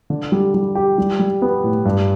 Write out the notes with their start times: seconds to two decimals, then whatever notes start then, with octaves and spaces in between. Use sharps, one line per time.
0.10 D3
0.32 G3
0.54 G3
0.75 G4
0.98 G3
1.19 G3
1.42 B3
1.64 A2
1.85 G2